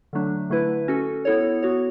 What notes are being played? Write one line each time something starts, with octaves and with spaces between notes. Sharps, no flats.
D3 F#3 A3 D4
D3 A3 E4 B4
C#4 F#4 A4
B3 E4 A4 C#5
B3 F#4 C#5